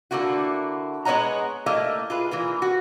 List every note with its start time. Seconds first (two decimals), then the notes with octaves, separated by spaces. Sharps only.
0.11 D3 A3 A#3 E4 F#4
1.05 G#3 B3 C#5 D#5 F#5 A#5
1.66 A3 A#3 E4 D#5 F5
2.10 F4 G#4 B4
2.31 E3 A#3 F4
2.62 F#4